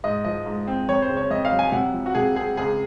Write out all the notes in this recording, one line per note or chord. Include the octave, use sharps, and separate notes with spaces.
G#2 D#5
F3 D#5
G#2
C4
F2 C#5
C5
C#3
C#5
F2 D#5
F5
F#3
G#5
C3 F#5
F3
F#4
C3 G#4
C4 G#4
C#2 G#4